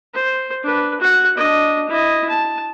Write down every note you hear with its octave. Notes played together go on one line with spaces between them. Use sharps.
C5
D4 B4
F#4 F#5
D4 D#5
E4 D#5
A5